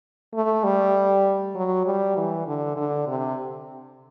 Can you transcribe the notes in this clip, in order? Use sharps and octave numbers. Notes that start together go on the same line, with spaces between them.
A3
G3
F#3
G3
E3
D3
D3
C3